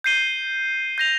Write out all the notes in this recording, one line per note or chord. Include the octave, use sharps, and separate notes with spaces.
G6 C7 D#7 G7
G6 A#6 F7